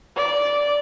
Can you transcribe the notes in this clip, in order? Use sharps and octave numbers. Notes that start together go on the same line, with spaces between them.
D5